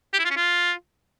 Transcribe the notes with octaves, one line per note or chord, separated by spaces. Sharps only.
G4
E4
F4
C#4
F4